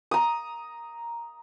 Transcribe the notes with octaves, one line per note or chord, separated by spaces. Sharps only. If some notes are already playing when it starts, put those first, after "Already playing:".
A#5 D#6